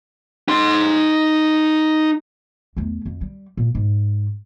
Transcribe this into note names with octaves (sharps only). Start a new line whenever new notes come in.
D#4 C6
E2 A3
F2
G3
A#2
G#2